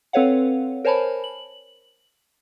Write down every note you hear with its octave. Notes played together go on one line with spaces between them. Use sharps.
C4 A4 B4 C#5 F5 F#5
A#4 C5 C#5 G#5 A5 B5
F#7